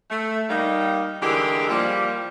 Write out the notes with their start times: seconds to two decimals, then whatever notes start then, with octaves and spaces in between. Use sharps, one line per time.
0.10 A3
0.50 G3 A#3 D#4
1.21 D3 E3 G#3 G4 G#4 A#4
1.69 F3 G3 A#3